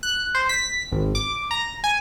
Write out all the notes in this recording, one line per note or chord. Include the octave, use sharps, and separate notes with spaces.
F#6
C5
B6
G#1
D6
A#5
G#5